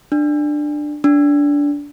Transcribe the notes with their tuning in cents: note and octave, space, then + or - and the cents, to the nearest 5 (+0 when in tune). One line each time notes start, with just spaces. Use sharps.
D4 +15
D4 -20